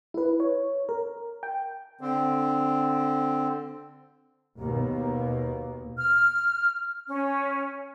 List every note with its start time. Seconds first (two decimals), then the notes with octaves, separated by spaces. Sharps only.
0.14 E4 B4
0.40 C#5
0.89 A#4
1.43 G5
2.01 D3 C4
4.59 D#2 B2 A#3
5.98 F6
7.07 C#4